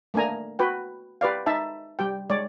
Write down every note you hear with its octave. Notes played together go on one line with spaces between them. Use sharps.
A3 A#3 D4 G#5 A#5
F#4 B4 G5
G4 B4 D5 F5
D#4 E5 A5
G3 G4 G5
G#3 C#5 D5